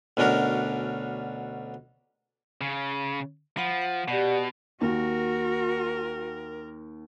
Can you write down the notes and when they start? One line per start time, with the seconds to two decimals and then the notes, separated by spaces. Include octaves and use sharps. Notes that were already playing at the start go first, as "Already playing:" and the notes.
0.17 D2 B2 C#4 D4 A#4
2.61 C#3
3.57 F3 F#5 B5
3.82 F#5
4.08 B2 G4 D5 F#5
4.81 D#2 F#4 A#4